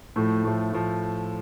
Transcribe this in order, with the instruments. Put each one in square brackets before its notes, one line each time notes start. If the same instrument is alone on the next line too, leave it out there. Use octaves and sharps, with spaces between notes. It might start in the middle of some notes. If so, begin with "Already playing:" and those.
[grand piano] A2 F3 A3
A2 F3 A3
A2 F3